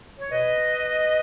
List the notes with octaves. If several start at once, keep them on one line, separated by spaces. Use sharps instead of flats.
C#5
B2 B4 D#5